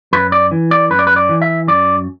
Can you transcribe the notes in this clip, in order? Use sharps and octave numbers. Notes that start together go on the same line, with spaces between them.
F#2 B4
D5
E3
D5
F#2 B4
D5
B4
D5
E3
E5
F#2 D5